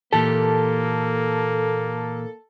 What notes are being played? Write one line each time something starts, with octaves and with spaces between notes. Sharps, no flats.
A#2 E3 A#3 G4 A4